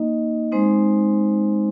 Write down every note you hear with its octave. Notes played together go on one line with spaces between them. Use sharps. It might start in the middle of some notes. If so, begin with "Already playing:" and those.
Already playing: A#3 D#4 D#5
G#3 C4 D#4 C5